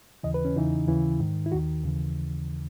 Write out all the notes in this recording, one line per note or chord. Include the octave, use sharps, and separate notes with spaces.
D#2 C#3 E3 D#5
B4
C#4
E2 C#3 E3 D#4
D#2 C#3 E3 E4
G#2 D#3
E4
D#2 D#3 F#4
D#2 C#3 E3